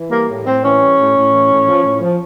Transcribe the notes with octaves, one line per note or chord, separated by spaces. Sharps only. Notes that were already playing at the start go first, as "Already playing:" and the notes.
Already playing: E3
G3 A#3
A2
A2 C4
E3 C#4
G3
A2
A2
E3
A2
F3
A2
F3